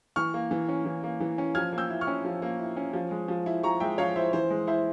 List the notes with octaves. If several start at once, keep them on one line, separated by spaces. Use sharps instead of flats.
E3 C#6 F6
A#3
E3
C#4
E3
A#3
E3
C#4
F3 F6 G#6
A#3
E6 G6
E4
C#6 F6
C#4
F3
A#3
E4
C#4
F3
G#3
F3
E4
F3 A#5 C#6
G#3 E5 G5
F3 C#5 F5
E4 C5 E5
E3 C5
G#3
E4 C5 E5